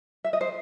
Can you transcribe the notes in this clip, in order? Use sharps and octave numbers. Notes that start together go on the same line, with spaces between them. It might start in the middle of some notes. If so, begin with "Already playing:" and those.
E5
D#5
C5